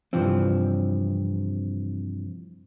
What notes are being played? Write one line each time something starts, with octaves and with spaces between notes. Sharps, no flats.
G2 C3 E3 F3 C4